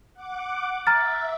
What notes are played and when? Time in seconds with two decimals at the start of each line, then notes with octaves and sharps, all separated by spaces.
0.14 F#5 D6
0.87 E5 A#5 F6 A6